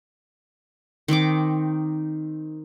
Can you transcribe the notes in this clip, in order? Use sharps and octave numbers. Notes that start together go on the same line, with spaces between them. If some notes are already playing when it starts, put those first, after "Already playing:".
D#3 C4 D#4 D6